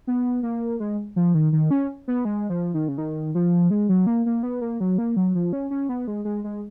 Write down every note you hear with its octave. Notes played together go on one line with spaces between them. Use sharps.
B3
A#3
G#3
F3
D#3
D#3
C#4
B3
G#3
F3
D#3
C#3
D#3
F3
G#3
F#3
A#3
A#3
B3
A#3
F#3
A#3
F#3
F3
C#4
C#4
B3
G#3
G#3
G#3